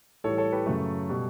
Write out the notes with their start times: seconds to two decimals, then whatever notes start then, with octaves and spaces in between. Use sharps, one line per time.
0.24 A2 E3 G3 A4 C#5
0.38 A4 C#5
0.52 G4 B4
0.66 F#2 C#3 F#3 A3 A4
1.09 B2 G3